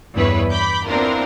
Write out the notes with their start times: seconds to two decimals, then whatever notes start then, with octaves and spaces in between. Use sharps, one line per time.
0.14 E2 G2 B3 E4 B4 C#5
0.51 B5 D6 G6
0.87 B3 C4 D4 E4 F4 A#4